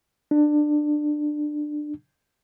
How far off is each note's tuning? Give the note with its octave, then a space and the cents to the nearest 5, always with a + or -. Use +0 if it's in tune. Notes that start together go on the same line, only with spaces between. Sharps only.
D4 +20